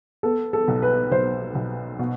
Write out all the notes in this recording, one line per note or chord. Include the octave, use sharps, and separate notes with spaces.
B3 A4
A4
B1
B4
B1 C5
B1
B2